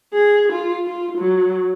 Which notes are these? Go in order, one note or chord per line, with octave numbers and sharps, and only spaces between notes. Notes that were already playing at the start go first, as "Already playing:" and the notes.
G#4
F4
F4
F#3